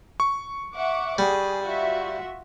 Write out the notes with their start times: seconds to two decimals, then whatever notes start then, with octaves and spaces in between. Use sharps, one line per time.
0.20 C#6
0.74 E5 F#5 D6
1.18 G3 G#4
1.62 F4 F#4 E5